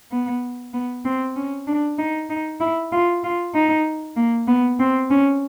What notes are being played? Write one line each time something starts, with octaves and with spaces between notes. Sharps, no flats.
B3
B3
C4
C#4
D4
D#4
D#4
E4
F4
F4
D#4
A#3
B3
C4
C#4